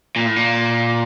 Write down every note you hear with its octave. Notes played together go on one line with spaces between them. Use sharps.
A#2
A2
A#2